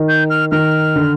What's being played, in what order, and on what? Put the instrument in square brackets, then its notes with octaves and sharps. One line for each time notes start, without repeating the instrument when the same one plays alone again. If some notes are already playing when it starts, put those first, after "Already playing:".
Already playing: [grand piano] D#3
[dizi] G6
F6
[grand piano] D#3 [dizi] F6
[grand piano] D3